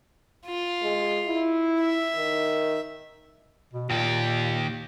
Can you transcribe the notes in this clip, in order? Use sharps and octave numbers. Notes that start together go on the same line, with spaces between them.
F4
G#3
E4
E5
D#3
B2
D#2 A#2 G4